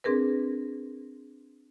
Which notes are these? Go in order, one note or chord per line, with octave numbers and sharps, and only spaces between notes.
C4 D4 G#4 A#4 B4